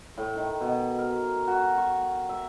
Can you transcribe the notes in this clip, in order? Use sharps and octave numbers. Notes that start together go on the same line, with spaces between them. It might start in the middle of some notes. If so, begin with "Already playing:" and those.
A2
D#3
B2
A#4
F#4
C#6
E5